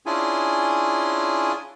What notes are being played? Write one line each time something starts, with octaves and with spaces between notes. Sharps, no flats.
C#4 D4 E4 F4 G#4 G#5